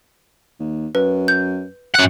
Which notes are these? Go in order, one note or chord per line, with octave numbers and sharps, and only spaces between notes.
D#2
F#2 B4
G6
F#2 F#5